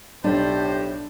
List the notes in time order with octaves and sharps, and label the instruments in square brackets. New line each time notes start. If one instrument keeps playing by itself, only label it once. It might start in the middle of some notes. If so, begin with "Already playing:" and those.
[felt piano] B1 [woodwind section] A2 [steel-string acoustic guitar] D4 [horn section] E4 G4 C5